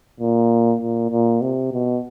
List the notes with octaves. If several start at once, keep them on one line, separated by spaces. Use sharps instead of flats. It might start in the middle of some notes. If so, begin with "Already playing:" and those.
A#2
A#2
A#2
C3
B2